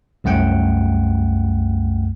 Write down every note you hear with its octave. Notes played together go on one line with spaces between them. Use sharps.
C2 F#2 A3 F#5 G5